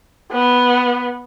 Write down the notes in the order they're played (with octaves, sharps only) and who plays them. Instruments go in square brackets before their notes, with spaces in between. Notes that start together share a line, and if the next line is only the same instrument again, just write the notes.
[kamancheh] B3